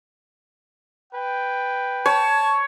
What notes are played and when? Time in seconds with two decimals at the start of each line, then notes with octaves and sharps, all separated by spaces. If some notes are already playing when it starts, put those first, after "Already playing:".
1.14 B4 G5
2.06 C#5 A5